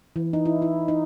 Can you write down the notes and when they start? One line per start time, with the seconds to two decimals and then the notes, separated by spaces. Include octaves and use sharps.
0.16 E3
0.33 D#4
0.46 E4
0.62 E4
0.88 D#4